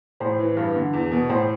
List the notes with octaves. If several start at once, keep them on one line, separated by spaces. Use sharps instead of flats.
A2 C5
E3
G2
D3
E2
B2
A2 C5